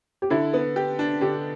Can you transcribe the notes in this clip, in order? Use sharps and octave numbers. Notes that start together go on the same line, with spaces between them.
G4
D3 E4
B3
G4
D4
D3 G4